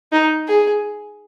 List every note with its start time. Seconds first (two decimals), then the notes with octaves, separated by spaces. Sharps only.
0.12 D#4
0.48 G#4